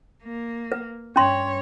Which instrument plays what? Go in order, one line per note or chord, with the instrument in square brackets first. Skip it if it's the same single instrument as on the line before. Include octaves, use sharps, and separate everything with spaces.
[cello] A#3
[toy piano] B4
[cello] G2 C#5 [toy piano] C#4 C6